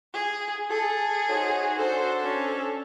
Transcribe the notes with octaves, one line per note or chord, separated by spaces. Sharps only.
G#4
G#4 A4
D#4 F#4 C5 C#5
D4 A4 C5
C#4